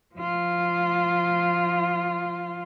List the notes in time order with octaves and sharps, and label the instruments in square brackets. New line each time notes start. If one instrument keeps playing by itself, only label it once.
[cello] F3 F4